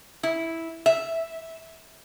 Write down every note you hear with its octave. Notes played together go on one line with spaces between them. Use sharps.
E4
E5